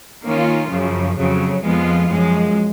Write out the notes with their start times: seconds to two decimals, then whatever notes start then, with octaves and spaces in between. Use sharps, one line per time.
0.24 D#3 A#3 C#4 F4
0.70 F#2 C#3 F3
1.16 F2 C#3 F#3
1.63 F2 F3 G#3 B3 F4
2.09 F#2 F3 G#3